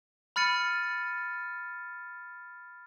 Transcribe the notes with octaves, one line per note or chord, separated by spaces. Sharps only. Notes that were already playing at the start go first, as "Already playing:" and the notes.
B5 F6 A6 C#7 D#7